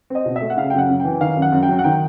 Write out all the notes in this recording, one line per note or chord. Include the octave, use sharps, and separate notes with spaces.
C4 D#5
B2
E5
A3
F#5
C#3 F5
G5
F#2 F#5
F#2
E3 G5
D#3 F5
F#2
F#5
F#2
G5
F#3
F#5
D#3 G5